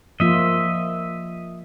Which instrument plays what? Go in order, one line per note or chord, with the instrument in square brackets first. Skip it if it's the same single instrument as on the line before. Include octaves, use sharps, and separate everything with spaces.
[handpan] F3 A#3 F4 [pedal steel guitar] D#5 E5